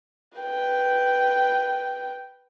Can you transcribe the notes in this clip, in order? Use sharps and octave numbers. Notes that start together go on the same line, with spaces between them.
B4 G5